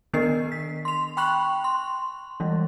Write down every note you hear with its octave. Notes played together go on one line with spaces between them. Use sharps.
D#3 B3 D4 A#4 D#5 C7
B6
C6 F7
G5 B5 C#6 F#6 F7 F#7
C6
E3 G3 G#3